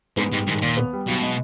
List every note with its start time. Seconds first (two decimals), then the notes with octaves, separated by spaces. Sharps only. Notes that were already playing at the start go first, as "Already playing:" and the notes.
0.17 G#2 B3
0.32 G#2 G3
0.47 G#2 D#3
0.62 D#2 A#2
0.77 B3
0.93 G3
1.08 B1 B2
1.22 G#3